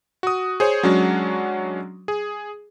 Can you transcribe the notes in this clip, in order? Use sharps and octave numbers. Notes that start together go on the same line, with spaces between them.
F#4 D#6
G#4 C5 C#5
F#3 G#3 C#4 D4 F#4
G#4